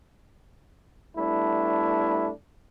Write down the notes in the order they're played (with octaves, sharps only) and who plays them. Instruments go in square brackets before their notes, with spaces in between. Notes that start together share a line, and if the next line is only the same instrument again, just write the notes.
[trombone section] G3 A3 B3 D4 E4